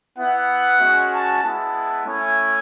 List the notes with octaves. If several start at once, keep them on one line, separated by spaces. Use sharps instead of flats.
B3 E4 F#5
G#3 C#4 F#4
A5
G#3 B3 E4 A5
A3 C#4 E4 G#5